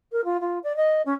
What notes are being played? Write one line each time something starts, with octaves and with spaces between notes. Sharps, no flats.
A#4
F4
F4
D5
D#5
C#4